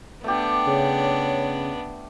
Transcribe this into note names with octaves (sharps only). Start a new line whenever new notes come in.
A3 B3 D4 G4
C#3 C#5